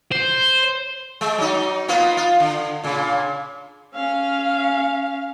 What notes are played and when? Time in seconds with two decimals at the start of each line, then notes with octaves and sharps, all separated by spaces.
0.12 C5
1.21 G#3
1.38 F#3 D#4
1.88 A#3 B3 F4
2.17 F4
2.40 D3
2.84 A#2 C#3
3.95 C#4 F5